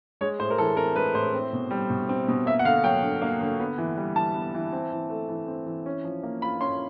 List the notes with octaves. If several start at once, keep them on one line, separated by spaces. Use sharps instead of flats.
G#3 C#5
A2 C5
A#4
E3 A4
C4 A#4
G#3 B4
A2 C5
C4
B2
G3
B2
C4
B2
A#3 E5
F#5
D3 F5
F#3 G5
D3
A#3
D3
B3
E3
G3
E3 A5
B3
E3
C4
E3
A3
E3
C4
E3
C#4
F3
A#3
F4 B5
C#4 C6